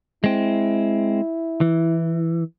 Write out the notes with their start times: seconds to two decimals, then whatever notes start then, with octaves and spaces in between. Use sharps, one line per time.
0.24 G#3 C4 E4
1.61 E3